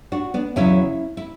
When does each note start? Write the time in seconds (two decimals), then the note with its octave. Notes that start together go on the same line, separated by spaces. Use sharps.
0.12 D4 F#4
0.34 B3 D4
0.56 E2 C#3 F#3 C#4 E4
1.17 E4